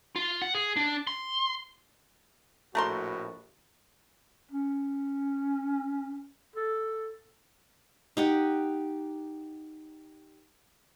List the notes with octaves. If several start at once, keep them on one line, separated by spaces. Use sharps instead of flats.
F4
F#5
G#4
D4
C6
A#1 A2 A3 F#4 A#4 C6
C#4
A4
D#4 G4 F#5